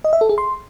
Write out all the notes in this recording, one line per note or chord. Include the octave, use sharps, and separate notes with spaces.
D#5
E5
A4
G#4
C6